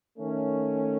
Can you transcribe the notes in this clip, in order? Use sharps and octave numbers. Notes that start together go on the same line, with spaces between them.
D#3 A3 C#4